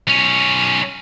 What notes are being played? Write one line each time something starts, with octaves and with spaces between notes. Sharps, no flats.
B1 C#4